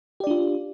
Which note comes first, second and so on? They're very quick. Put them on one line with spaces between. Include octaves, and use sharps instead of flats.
G4 D5 D4 F4